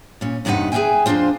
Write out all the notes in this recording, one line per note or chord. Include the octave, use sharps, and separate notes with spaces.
A#2 C#4
E2 G2 C3 D#4 B4 F#5
G#4 B4 C5 E5 G5 G#5
F2 A#3 D4 F4 C5